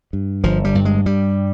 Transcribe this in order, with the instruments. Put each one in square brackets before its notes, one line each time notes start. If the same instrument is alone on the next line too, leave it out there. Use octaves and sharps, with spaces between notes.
[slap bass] G2
G1 F3
G3
G2
G#3
G2 G3